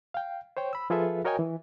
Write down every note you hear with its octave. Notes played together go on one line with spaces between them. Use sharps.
F5 G5
C5 C#5 G5
B5 E6
F3 F4 G#4 A4 B4 E5
F#4 A#4 C#5 D#5 G5 G#5
E3